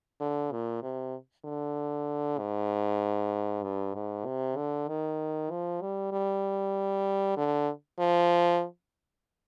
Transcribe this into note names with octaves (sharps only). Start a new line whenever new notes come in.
D3
A#2
C3
D3
G#2
G2
G#2
C3
D3
D#3
F3
G3
G3
D3
F3